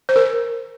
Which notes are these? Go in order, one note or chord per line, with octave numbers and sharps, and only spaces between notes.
C5
A#4